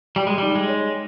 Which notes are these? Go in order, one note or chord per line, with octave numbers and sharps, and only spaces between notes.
G3 G5
G#3
G3 D#4
G#3
C#5